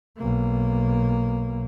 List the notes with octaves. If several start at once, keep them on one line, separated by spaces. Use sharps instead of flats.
B1 A#3